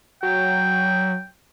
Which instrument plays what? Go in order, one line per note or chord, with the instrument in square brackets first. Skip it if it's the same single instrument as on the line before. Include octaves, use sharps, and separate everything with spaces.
[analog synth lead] F#3 [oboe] G5